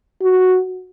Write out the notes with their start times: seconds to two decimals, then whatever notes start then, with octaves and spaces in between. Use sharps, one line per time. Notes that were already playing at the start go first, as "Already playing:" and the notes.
0.22 F#4